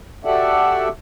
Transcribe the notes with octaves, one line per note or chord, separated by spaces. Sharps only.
F#4 G4 A4 D5 E5 F#5